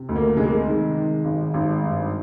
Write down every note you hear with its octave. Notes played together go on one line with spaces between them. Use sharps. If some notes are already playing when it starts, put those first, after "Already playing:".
Already playing: C3
D2
A#3
C3 G#3
A#3
G#3
D#3
D#3
G#1
G#1
G2